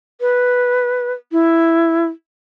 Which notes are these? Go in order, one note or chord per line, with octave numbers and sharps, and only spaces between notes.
B4
E4